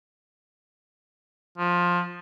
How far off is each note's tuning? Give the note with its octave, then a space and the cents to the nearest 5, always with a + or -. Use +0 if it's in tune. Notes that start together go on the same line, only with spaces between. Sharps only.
F3 +15